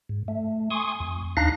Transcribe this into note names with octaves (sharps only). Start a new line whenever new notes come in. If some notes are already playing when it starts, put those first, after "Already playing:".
G#2
A3
G#5 C6 C#6 D#6
F2
D#2 D4 D#4 F5 F#6 A#6